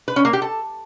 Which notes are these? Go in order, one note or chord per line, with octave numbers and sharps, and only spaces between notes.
B4
C#4
A#3
G4
A4